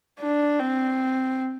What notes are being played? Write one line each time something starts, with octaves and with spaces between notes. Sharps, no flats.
D4
C4